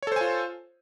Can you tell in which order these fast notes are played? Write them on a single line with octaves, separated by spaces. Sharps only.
C#5 A4 C5 G#5 F4